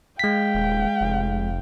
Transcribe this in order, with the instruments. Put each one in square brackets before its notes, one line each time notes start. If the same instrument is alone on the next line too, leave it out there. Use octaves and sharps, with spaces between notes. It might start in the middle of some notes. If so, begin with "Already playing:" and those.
[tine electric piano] G#3 B6 [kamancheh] F5 G5
[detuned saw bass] D#1
F1